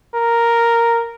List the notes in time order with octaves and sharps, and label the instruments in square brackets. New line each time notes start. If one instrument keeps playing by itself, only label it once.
[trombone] A#4